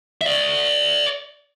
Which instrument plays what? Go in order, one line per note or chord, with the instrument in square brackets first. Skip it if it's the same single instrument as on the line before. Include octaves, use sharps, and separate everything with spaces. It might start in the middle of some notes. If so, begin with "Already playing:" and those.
[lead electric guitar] D5 E5